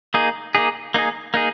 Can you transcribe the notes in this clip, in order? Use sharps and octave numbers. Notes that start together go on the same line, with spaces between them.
A#3 D#4 G#4
A#3 D#4 G#4
A#3 D#4 G#4
A#3 D#4 G#4